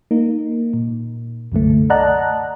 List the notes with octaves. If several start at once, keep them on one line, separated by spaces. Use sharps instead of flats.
A#3 D#4
A#2
C2 F#2 D3 A3
D5 D#5 F#5 A5 A#5 F#6